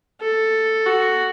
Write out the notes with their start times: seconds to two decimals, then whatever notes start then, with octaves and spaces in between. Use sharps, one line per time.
0.21 A4
0.86 F#4